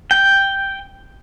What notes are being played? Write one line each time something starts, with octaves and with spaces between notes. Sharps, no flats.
G5